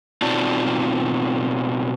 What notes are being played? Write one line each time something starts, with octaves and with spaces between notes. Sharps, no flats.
B2 C4 D#4 F4 D5 A5